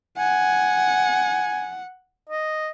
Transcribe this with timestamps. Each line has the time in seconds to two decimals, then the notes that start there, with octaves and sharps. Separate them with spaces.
0.18 F#5 G#5
2.29 D#5